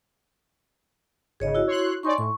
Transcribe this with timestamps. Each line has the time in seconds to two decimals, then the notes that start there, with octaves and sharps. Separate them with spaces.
1.40 G#1 C#3 G#4 C#5 D#5
1.55 E4 F#4
1.67 C#5 C6 F#6
2.03 D#4 C#5 D5 G#5 C6 C#6
2.18 A2 C#6